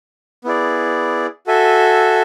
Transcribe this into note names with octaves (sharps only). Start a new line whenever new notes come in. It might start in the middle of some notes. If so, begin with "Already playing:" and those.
B3 E4 G#4 D5
F#4 A4 E5 G#5